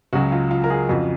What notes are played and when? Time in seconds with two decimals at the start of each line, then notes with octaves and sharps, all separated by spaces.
0.13 C#2 C#3 F#3 F#4
0.32 F4
0.51 F4
0.64 A#4
0.70 F4 G#4
0.89 F2 C#3 F3 F#4